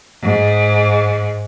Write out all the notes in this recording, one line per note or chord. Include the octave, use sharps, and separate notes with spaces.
G#2